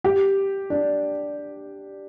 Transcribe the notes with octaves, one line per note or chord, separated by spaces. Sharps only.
G4
D4